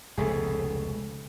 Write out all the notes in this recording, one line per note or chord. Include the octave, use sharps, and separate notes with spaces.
F1 C#2 B2 A3 G#4